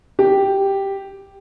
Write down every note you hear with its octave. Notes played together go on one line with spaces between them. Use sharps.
G4